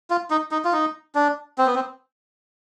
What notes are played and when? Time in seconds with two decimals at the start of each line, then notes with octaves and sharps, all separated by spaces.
0.10 F4
0.30 D#4
0.51 D#4
0.65 F4
0.73 D#4
1.15 D4
1.58 C4
1.66 B3
1.75 C4